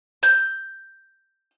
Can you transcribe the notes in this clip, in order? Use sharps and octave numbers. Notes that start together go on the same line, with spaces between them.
G6